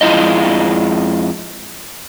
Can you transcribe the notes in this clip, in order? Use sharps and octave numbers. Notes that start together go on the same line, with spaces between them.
F2 G#3 E4 F4 D#5